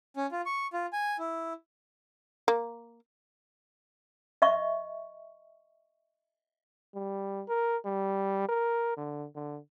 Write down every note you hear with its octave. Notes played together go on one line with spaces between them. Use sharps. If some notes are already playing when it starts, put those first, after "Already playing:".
C#4
F4
C#6
F4
G#5
E4
A#3
D#5 E5 C#6
G3
A#4
G3
A#4
D3
D3